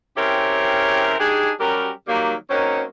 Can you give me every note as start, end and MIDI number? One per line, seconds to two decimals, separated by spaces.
0.17 1.14 49
0.17 1.14 60
0.17 1.14 64
0.17 1.14 67
0.17 1.14 70
0.17 1.14 73
1.20 1.50 62
1.20 1.50 63
1.20 1.50 67
1.20 1.50 68
1.60 1.90 54
1.60 1.90 55
1.60 1.90 61
1.60 1.90 67
1.60 1.90 70
2.08 2.33 51
2.08 2.33 54
2.08 2.33 55
2.08 2.33 58
2.50 2.83 54
2.50 2.83 58
2.50 2.83 60
2.50 2.83 61
2.50 2.83 63
2.50 2.83 73